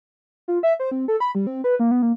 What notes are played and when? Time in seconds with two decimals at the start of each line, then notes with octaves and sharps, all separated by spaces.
0.48 F4
0.63 E5
0.80 C5
0.91 C4
1.08 A4
1.20 B5
1.35 G3
1.47 C4
1.64 B4
1.80 A#3
1.91 B3
2.02 A#3